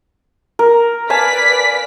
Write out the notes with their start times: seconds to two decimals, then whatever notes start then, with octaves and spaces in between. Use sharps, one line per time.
0.59 A#4
1.10 B4 D5 F5 G#5 A5 B6